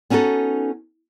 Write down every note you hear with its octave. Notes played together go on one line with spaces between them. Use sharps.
B3 C#4 D#4 F#4 A4